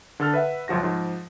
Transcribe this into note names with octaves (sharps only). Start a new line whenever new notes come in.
D3 A4 F6
B4 E5 F#5
C#2 F#2 F3 F#4 A#6
G#2 F3